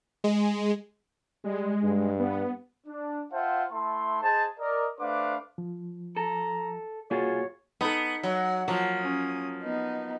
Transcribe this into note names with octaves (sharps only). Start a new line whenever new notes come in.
G#3
G3 G#3
G2
B3
D4
F4 C5 E5 F#5 G5 A5
A3 E4 A5 C6
G#4 C5 D#5 A5
A#4 D5 D#5
A3 D4 B4 C5 F5 D6
F3
A4 A#5
C2 A#3 F4 F#4 G#4 C#5 A6
B3 D#4 A4
F#3 F#5
F3 F#3 A#3
C#4 D#6
B3 D#4